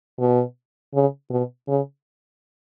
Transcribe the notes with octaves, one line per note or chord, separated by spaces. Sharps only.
B2
C#3
B2
C#3